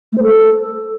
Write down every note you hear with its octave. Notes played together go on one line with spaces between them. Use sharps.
A3
C5
A4